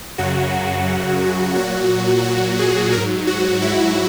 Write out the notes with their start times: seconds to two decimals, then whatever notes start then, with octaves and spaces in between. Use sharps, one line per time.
0.18 F#2 C#3 F#3 F#4
1.55 A#2 F#3 F#4
2.24 F#4
2.59 G#4
2.93 G#2 F#3 A#4
3.27 F#4
3.62 E4